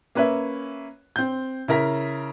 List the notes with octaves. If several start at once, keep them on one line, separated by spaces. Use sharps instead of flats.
A#3 C#4 B4 C#5 E5
C4 G6
C#3 E4 A#4 A#5 B6